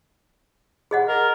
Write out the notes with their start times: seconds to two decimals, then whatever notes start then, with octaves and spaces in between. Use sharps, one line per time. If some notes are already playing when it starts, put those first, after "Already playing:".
0.91 G#4 D#5 F#5
1.08 A#4